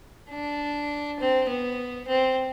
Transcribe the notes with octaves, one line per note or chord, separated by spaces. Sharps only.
D4
C4
B3
C4